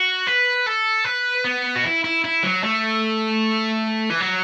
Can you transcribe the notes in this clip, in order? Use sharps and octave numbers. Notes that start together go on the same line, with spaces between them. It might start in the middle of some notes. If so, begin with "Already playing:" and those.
Already playing: F#4
B4
A4
B4
B3
F#4
E4
E4
E4
F#3
A3
E3
F#3